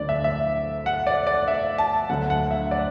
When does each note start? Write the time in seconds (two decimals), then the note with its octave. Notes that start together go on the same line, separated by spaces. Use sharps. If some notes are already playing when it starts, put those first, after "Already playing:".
Already playing: D2 D3 F#3 D5
0.09 E5
0.24 E5
0.86 F#5
1.07 D5
1.27 D5
1.48 E5
1.78 A5
2.09 D2 D3 F#3 F#5
2.30 F#5
2.51 E5
2.71 D5